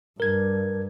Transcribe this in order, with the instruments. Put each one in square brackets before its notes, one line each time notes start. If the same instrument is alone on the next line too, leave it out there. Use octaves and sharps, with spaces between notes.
[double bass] G2 [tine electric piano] A#4 G#6